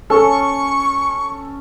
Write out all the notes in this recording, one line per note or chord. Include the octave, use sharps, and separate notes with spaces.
C#4 A4 C#6